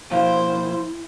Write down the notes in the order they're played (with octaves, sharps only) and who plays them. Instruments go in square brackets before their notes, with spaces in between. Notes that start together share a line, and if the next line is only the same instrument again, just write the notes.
[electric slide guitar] B2 F3 A#3 [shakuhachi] E4 [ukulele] F#4 F5 G5 [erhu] C5